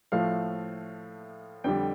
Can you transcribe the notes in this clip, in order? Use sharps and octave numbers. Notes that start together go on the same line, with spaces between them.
A2 F3 A3 F5
F2 D3 G3 G5